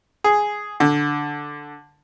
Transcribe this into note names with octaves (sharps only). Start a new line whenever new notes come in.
G#4
D3